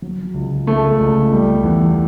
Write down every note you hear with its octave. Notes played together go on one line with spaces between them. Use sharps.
F#3
C#2
C#3 A3
C#2
G3
E2